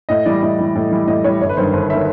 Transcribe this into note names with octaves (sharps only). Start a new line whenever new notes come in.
A2 D#5
E3 G3 D5
A2 D#5
E3 G3
A2
E3 G3
A2 D#5
E3 G3 C#5
G1 C#5
B4
G2 D#3 C5
G1 C5
B4
E5
D#3